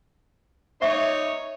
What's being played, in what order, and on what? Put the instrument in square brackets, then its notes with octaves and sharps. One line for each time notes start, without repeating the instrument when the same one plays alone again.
[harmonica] D#4 C#5 [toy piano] E5 C#6